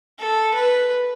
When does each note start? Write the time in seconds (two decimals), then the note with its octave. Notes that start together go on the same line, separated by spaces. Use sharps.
0.19 A4
0.54 B4